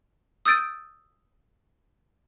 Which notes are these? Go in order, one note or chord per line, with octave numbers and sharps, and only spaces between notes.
D#6 E6 G6 A6 D7 D#7